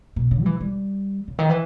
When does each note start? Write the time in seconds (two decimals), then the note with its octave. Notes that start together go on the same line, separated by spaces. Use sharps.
0.16 B2
0.31 C#3
0.42 G3
0.46 E3
0.60 G3
1.28 C#3
1.39 D#3
1.50 E3